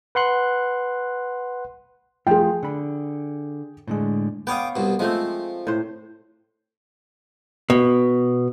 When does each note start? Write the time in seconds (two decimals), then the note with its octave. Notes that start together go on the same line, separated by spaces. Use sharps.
0.15 B4 F#5 C6 F#6
2.27 F3 A3 F4 G#4 G5
2.63 D3 B5
3.87 A2 D3 G#3
4.47 B3 C#5 F5 G5 D6 D#6
4.76 C2 B2
4.99 F3 G#3 A3 C4
5.67 A2 C5
7.70 B2